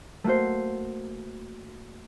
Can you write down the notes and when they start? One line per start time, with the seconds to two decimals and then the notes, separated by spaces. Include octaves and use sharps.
0.24 A3 A#3 F#4 C5